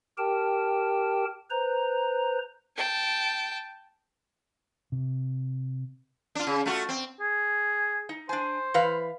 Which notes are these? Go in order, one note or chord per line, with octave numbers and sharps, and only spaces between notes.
G4 A#4 G5 A5
B4 C5 A#5
G5 A5
C3
D4 F4
C#3
A3 F4 F#4
C4
G#4
D#4
D4 C5 G#5
E3 B4 F5